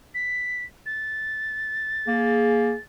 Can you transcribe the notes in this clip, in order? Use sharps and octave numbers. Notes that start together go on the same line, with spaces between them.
B6
A6
A#3 G#4